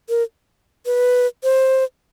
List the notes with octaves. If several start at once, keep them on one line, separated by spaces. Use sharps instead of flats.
A#4
B4
C5